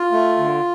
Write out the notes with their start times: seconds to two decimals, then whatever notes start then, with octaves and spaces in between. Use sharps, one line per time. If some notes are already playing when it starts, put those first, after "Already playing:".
Already playing: F4
0.12 A3
0.38 D3